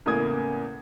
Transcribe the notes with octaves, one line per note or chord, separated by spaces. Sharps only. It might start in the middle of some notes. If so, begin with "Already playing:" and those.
E2 A2 C#3 A#3 D#6 G#6